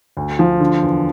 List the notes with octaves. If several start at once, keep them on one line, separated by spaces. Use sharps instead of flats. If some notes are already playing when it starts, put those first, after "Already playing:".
D2
F3
D3
E2